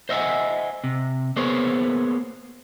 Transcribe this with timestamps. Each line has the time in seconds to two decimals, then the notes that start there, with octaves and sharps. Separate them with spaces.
0.09 C5 D#5 E5 F#5 G#5
0.84 C3
1.36 A#3 B3 G#4 C5 C#5